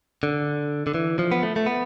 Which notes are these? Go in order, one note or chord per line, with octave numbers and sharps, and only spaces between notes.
D3
D3
E3
F3
B3
A3
A3
B3